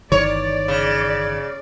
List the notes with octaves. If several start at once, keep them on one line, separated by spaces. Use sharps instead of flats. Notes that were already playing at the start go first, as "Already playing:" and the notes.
G1 D#3 E3 C#5 D5
C#3